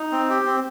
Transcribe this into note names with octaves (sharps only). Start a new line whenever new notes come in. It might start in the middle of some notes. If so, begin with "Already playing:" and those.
Already playing: D#4
C4
G4
C4